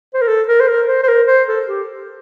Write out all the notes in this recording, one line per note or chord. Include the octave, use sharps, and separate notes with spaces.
C5
A#4
A4
A#4
C5
A#4
C5
C5
A#4
C5
A4
G4